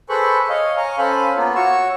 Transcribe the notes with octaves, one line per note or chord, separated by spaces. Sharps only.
G#4 A4 B4 C5 B5 C#6
C#5 D#5 F5
F5 G#5 A#5 C#6
C#4 A4 C5 F5 G#5 B5
A#3 B3 F4
F#4 C#5 C#6 E6